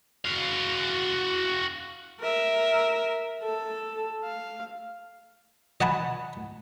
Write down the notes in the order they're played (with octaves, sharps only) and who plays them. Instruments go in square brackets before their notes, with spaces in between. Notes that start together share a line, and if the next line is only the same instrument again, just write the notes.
[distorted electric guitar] F#4 F5
[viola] A#4 E5
A4
F5
[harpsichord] D#5 F#5 G#5 A5 B5